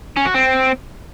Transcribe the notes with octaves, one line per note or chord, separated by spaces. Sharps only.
C#4
F#4
C4